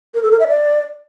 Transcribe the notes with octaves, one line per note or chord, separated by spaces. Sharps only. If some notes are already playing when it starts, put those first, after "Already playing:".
A#4
A4
A#4
E5
D5